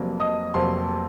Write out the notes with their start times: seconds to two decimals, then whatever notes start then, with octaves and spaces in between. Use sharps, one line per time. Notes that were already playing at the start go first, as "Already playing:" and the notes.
Already playing: F1 F2 C3 F#3 A#3
0.20 D#5 D#6
0.54 F1 F2 C3 F#3 A#3 C5 C6